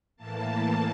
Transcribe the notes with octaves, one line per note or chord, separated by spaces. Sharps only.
A2 E3 A#3 A5